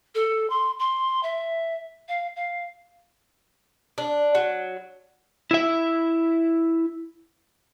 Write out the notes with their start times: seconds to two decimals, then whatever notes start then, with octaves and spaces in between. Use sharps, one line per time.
0.15 A4
0.50 C6
0.79 C6
1.23 E5
2.08 F5
2.36 F5
3.98 D4
4.35 F#3
5.51 E4 E5